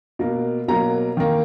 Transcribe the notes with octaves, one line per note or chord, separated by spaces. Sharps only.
B2 A#3
B2 F#3 A#3 A#5
D#3 A#3